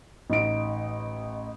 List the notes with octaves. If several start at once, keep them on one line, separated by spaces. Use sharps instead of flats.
A1 D#4 D7